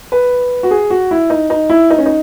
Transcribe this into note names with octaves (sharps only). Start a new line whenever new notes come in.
B4
F#4
G#4
F#4
E4
D#4
D#4
E4
D#4
C#4
D#4